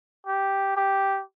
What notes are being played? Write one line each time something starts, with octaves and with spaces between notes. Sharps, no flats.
G4
G4